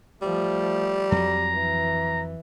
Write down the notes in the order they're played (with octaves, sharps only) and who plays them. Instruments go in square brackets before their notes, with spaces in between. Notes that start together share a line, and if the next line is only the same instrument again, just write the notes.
[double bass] F3 A3 [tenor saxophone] G3
[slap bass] F2 F#3 [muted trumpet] A#5
[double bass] E3